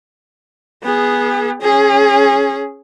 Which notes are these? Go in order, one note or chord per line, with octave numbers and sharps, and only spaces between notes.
B3 G#4
C#4 G#4